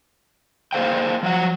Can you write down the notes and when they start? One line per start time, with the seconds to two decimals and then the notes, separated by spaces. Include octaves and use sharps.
0.73 A#3 G#4 C5 F5 G5
1.23 F3 F#3 F#5